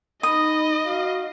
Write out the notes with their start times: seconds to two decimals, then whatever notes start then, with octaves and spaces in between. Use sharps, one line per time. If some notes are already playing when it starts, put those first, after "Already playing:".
0.23 D#4 D#5 B5 D#6
0.84 F#4 F5